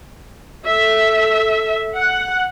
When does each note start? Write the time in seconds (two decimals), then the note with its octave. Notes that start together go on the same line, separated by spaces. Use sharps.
0.66 A4 E5
1.96 F#5